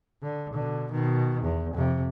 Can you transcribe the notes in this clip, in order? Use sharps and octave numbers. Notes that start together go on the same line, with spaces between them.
D3
B2 D3
B2 D#3
E2
F2 C3